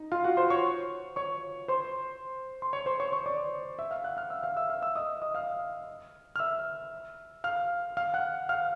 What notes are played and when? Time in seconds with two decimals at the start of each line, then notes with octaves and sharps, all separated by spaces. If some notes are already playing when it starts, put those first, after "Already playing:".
Already playing: D#4
0.12 F4 F5
0.24 F#4 F#5
0.37 C5 C6
0.50 C#5 C#6
1.16 C#5 C#6
1.68 C5 C6
2.62 C6
2.73 C#5 C#6
2.86 C5 C6
3.00 C#5 C#6
3.12 C#5 C#6
3.26 D5 D6
3.79 E5 E6
3.91 F5 F6
4.04 F#5 F#6
4.17 F5 F6
4.30 E5 E6
4.43 F5 F6
4.57 E5 E6
4.70 F5 F6
4.82 E5 E6
4.96 D#5 D#6
5.22 D#5 D#6
5.35 F5 F6
6.36 F6
6.39 E5 E6
7.44 F5 F6
7.97 F5 F6
8.14 F#5 F#6
8.49 F5 F6